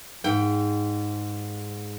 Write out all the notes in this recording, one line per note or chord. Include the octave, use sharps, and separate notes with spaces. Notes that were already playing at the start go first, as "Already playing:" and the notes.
G#2 G5